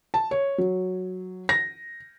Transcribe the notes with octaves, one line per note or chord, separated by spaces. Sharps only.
A5
C#5
F#3
A#6